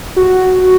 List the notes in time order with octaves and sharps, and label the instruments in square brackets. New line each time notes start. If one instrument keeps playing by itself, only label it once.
[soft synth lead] F#4